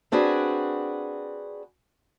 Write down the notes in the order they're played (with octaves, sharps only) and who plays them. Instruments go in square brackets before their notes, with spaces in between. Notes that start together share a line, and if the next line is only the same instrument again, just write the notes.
[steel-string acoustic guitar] C4 D4 F#4 G#4 B4